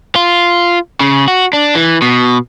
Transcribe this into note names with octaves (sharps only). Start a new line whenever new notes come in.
F4
C#3
F#4
D4
E3
B2